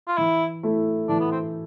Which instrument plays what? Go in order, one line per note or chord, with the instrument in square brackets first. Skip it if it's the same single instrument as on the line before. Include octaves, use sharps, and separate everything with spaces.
[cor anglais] F4
[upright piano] E3 [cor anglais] E4
[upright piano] A3 E4
[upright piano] E3 [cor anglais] D4
[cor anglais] B3
C4